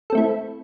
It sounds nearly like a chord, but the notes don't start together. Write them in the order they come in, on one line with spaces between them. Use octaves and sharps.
A4 C4 A3 E4